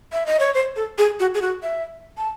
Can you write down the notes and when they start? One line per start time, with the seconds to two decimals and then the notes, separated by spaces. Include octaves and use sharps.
0.13 E5
0.26 D#5
0.40 C#5
0.54 C5
0.76 A4
0.98 G#4
1.20 F#4
1.34 G#4
1.42 F#4
1.63 E5
2.17 A5